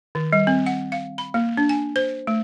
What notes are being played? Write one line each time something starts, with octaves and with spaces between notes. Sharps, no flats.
D#3
G3
C4
F#5
F5
B5
A#3
D4
G#5
C5
A3